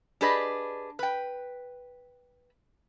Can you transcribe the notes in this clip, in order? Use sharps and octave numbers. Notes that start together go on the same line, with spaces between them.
D4 G4 G#4 B4 D5 D#5
B4 G5